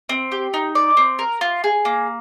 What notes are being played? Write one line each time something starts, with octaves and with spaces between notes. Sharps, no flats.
C4
G4
D#4
D5
C4
A#4
F4
G#4
A#3